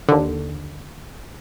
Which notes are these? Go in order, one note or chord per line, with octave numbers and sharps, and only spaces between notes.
D#2 D3